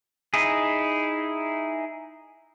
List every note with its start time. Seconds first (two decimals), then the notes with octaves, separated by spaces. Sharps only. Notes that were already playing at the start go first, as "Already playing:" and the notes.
0.34 D#4 E4 G#4